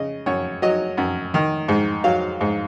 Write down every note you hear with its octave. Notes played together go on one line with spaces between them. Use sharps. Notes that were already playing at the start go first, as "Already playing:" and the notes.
Already playing: C#3 D#5
F#2 C#5
F#3 D#5
F#2
D#3
G#2
F#3 F5
G#2